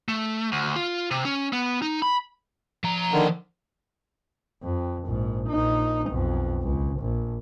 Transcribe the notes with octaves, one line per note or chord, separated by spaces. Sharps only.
A3
D2
F4
C3
C#4
B3
D#4
B5
F3 A#5
D3 D#3
F2
A#1 G#2
A#1 D#4
B1 F2
C#2
A#1